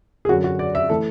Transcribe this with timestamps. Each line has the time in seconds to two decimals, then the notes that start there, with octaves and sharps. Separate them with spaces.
0.25 G#4
0.29 F#2 D3 F#3 F#4
0.44 F#4
0.59 D5
0.75 E5
0.90 E3 A3 A4